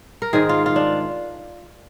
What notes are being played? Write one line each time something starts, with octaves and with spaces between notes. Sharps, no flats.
A#4
G#2 D#3 G#3 G#4
F4
F4
D4